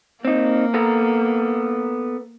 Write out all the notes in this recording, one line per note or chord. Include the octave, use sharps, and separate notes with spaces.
A#3 C4 D#4
B3 A4 A#5